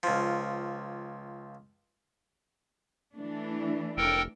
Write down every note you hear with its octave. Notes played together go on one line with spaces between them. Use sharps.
C#2 F3
E3 A3 D4
F1 A4 A#4 G5